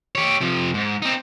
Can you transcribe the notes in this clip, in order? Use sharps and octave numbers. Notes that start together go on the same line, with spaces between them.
G4 C#5
C3 F3
G#2
C4 D#4